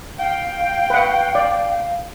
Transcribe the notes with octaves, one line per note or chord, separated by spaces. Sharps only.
F5 G5
B4 F#5
D5